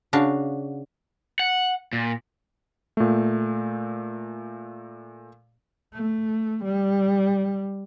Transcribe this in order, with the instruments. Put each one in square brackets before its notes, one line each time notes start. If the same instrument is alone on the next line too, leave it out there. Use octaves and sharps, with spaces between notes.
[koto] C#3 D4 F#4 F5
[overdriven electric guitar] F#5
A#2
[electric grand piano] A#2 A3
[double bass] A3
G3